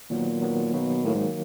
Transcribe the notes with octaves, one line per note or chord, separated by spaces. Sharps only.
A#2 D#3 F#3 B3
D#3 F#3 B3
B2 D#3 F#3 A#3
A2 D#3 F#3 A#3
G#2